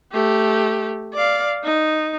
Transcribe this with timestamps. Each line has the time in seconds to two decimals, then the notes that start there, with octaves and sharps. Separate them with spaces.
0.12 A3 G4
1.14 D5 F5
1.64 D#4